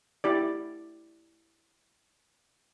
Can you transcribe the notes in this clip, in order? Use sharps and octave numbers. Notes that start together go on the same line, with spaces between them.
E4 G4 D5